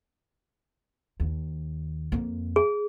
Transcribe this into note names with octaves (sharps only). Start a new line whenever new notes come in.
D#2
F2 A#3
G#4